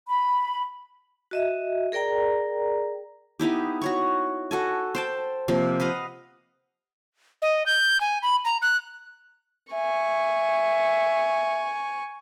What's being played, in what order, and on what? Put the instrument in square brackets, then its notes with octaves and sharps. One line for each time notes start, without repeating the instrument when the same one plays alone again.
[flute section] B5
[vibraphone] F#4 D#5 E5
G#4 A#4 D5 G5 A#5
[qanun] B3 D#4 E4 G4
F#4 C#5 C#6
F#4 A4 G#5
C5 G5 A5
C3 F3 A#3
B4 D#5 F5 F#5
[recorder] D#5
G6
G#5
B5
A#5
F#6
[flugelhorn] E5 [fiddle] G#5 C#6